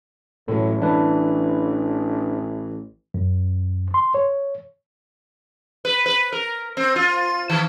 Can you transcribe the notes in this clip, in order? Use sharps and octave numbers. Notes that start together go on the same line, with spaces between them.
A1 A2 F#3
E3 D4 B4
F#2
C6
C#5
B4
B4
A#4
C4
F4
D#3